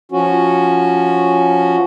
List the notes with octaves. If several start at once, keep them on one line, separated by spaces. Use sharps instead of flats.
F3 C#4 F#4